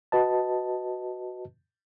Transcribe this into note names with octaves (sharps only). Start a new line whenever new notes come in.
F#4 B4 D#5 A5